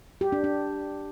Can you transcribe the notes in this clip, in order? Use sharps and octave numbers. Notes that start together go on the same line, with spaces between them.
G4
D4
D4